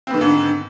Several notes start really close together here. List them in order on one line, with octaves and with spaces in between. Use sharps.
C4 B3 D#3 D3 G#2